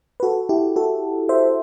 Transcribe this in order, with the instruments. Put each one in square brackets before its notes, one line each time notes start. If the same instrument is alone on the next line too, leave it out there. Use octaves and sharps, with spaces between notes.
[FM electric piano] B4
F#4 A4
E4 G4
F#4 A4
C5 E5